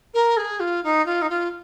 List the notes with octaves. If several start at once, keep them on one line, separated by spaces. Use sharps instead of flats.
A#4
G#4
F4
D#4
F4
D#4
F4